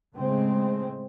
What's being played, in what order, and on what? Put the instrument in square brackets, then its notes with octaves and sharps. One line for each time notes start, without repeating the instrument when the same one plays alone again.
[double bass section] A2 C#3 G#3 C4